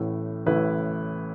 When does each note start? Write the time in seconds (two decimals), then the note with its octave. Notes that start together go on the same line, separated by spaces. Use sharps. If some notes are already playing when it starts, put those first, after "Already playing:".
Already playing: A1 A2 A3 E4 B4
0.46 A1 A2 A3 E4 B4